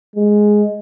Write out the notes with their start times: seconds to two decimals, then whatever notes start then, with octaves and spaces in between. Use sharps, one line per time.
0.16 G#3